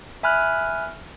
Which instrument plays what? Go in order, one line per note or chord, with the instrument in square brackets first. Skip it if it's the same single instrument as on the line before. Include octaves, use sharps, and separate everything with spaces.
[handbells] E5 G#5 B5 F6 F#6